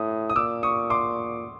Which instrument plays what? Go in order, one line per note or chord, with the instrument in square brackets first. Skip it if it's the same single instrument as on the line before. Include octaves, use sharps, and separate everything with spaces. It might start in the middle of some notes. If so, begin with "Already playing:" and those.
Already playing: [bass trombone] A2 [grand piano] D#6
[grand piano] D#6
[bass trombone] A#2 [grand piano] D6 E6
[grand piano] C#6 D#6
C6 D6